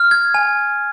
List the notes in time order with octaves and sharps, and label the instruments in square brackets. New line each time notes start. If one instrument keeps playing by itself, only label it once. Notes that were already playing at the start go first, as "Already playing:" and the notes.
Already playing: [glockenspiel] F6
G#6
G#5